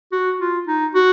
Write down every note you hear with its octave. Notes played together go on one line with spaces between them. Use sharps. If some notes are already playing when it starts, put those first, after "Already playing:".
F#4
F4
D#4
F#4